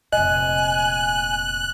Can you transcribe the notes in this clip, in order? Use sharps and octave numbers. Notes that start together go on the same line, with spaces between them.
F1 A#2 D#5 G#5 F#6